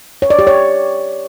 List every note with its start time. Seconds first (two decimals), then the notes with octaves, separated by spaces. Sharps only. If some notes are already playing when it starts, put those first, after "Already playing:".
0.22 C#5
0.30 D5
0.39 G4
0.47 C#5